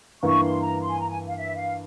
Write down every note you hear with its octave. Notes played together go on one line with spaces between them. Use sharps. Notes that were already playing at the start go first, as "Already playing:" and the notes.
G2 E3 A#3 C#6
C6
A#5
C6
G#5
A#5
G#5
F5
E5
F5